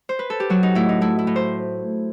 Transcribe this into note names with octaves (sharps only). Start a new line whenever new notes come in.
C5
B4
A4
G4
F#3 F#4
D#4
A2 E4
D#4
A3 E4
E4
A2
C5